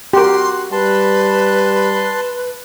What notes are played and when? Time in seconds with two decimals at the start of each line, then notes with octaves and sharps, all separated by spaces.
0.13 F#4 G4 A#4 C6
0.72 G3 B4 A5 C6